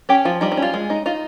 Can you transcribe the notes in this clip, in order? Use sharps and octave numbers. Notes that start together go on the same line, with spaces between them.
C#4 G4
F3 F4
G3 D#4
D#4
C#4
F4
G#3
D#4
D#4 F4